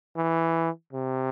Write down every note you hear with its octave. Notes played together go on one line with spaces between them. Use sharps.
E3
C3